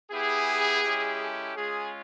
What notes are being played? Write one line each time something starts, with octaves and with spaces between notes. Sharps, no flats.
B3 E4 G4 G#4
G#3 C#4 E4 G4
A4
G#3 C#4 F4 G#4